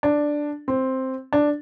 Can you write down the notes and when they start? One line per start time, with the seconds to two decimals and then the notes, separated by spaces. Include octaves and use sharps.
0.03 D4
0.68 C4
1.33 D4